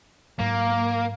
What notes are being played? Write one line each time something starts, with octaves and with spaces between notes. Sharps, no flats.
G#2 F#3 A#3